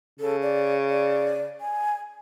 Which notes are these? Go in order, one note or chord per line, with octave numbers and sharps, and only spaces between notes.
C#3 A4
D5
D5
G#5